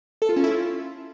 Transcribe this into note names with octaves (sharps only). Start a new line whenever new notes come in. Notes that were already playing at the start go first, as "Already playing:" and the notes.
A4
F4
C#4
E4
F4